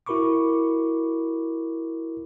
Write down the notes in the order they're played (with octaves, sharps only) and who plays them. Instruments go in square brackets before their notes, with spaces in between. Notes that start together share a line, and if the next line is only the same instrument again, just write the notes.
[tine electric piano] E4 F#4 A#4 B5 C#6 D6